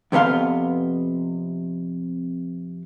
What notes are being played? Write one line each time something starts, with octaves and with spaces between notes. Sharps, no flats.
F2 C3 B3 F5 C6